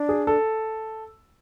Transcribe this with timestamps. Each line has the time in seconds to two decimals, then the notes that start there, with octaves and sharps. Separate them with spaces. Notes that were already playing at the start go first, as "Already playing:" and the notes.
Already playing: D4
0.09 G#4
0.27 A4